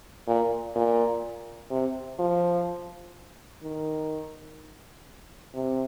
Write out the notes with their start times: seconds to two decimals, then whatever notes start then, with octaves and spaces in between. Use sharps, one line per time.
0.27 A#2
0.76 A#2
1.71 C3
2.19 F3
3.63 D#3
5.54 C3